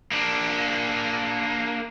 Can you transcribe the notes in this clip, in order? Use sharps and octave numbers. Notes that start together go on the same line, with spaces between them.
A#3 D4